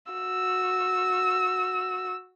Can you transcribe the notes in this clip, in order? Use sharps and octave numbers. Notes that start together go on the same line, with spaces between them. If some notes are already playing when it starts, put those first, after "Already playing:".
F#4 E6